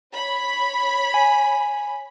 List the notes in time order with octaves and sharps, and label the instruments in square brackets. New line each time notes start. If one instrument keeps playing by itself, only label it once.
[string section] C#5 B5
[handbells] G#5